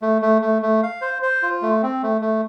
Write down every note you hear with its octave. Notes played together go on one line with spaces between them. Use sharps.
A3
A3
A3
A3
F5
C5
C5
F4
A3
C4
A3
A3